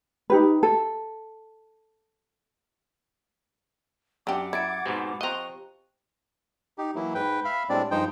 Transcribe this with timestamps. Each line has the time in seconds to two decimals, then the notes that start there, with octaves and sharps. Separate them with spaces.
0.30 D#4 G4 B4
0.63 A4
4.27 F#2 D4 G4 F#5 D6
4.53 E4 G#6 A6 D7
4.86 G#2 B2 C4 G4
5.21 F3 C4 D#5 A#5 C#6 F#6
6.78 D#4 G4
6.95 E3 F#3 A#3 E4
7.15 G#2 B4 G5
7.45 E5 F5 B5
7.70 A2 G3 G#3 C4 D4 D5
7.91 G2 F3 G#3 D#4 C5 G5